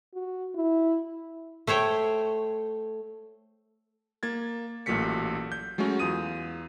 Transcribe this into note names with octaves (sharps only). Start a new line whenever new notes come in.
F#4
E4
A3 C5 C#5 G5
A#3 G#6 A6
A1 A#2 F#3 A3 B6 C#7
G6
F#3 G#3 A3 C#4 F#4
E2 F4 D#6 D#7